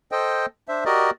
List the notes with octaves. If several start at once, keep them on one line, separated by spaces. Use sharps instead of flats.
A4 C5 D#5 G5
D4 C5 E5
F#4 G4 A#4 D5 D#5